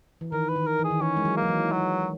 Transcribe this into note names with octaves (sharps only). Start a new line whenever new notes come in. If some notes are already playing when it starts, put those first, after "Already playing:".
E3
D#3 A#4
B4
D#3
A#4
E3
G#4
D#3
E3 C#4
G#3
F#3
A#3
F#3
E3
F#3